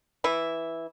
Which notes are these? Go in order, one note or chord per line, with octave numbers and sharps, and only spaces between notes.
E3 E4